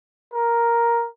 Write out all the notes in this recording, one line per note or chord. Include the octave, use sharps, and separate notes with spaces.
A#4